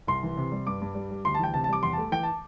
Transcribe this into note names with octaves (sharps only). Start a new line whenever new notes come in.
C2 C6
E3
C3
G3
G2 D6
G2
G3
G3
D2 C6
A5
E3 G5
C3 A5
A5
G3 D6
E2 C6
A5
A3
E3 G5
A5